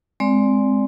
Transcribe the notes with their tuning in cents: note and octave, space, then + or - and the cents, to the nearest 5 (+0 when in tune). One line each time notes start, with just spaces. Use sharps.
G#3 +0 C4 +0 D5 -10